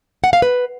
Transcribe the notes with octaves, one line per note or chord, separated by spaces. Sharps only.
F#5
F5
B4